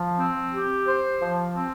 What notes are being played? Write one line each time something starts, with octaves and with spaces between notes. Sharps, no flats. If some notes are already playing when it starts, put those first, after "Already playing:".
Already playing: F3
C4
G4
C5
F3
C4